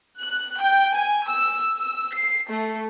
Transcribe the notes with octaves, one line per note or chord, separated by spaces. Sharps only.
F#6
G5
G#5
E6
E6
C7
A3